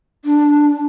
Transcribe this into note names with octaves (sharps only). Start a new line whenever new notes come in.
D4